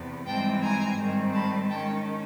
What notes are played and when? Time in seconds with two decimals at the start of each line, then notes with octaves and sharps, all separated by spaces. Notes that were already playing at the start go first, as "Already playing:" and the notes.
Already playing: E2 C3 B3
0.27 G#2 E3 G3 C4 G5 A5
0.62 G#5 A#5
0.98 G#2 D#3 G3 C4
1.33 A5 B5
1.70 D#3 G#3 C#4 G5 A5